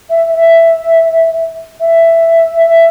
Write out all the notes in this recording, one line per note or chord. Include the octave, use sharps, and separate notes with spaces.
E5
E5
E5
E5